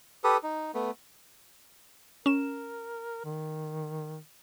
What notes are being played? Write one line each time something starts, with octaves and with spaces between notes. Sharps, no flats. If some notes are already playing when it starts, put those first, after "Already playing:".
G4 A4 B4 D#6
D#4
A3 B3
C#4 A#4 E7
D#3